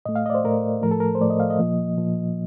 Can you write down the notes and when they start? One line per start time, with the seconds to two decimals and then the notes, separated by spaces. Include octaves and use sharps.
0.06 A2 A3 D#5
0.16 F5
0.26 D5 D#5
0.35 C5
0.44 A2 A3 A#4
0.82 A2 F3 A3 A#4
0.91 A4
1.00 A#4
1.15 C5
1.21 A2 F3 A3 D5
1.30 D#5
1.40 F5
1.50 D#5
1.59 A#2 F3 A#3
1.97 A#2 F3 A#3